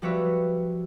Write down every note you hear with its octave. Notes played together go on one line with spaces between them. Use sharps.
F3 G3 B3 F#4 C#5 E5